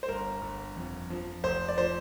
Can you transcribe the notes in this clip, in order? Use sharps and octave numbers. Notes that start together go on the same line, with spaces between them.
C5
G1 A#4
G1
F2
F3
F1 C5
D5
F3 C5